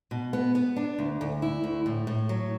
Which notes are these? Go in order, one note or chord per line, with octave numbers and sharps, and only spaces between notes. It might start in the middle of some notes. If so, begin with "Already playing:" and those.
B2
B3
B3
D4
D2
D2
E4
D2
A2
A2
F#3